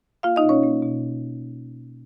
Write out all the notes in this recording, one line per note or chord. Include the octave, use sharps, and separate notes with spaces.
A#3 F4 F5
D#4 D#5
B2
C#4 C#5
A#3
B2